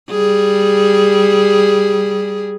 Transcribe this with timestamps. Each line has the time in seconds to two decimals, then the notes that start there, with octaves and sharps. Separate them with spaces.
0.11 G3 G#4